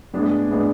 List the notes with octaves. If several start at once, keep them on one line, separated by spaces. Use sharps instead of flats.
A2 G#3 B3 D4 G#4
A2 G#3 B3 D4 G#4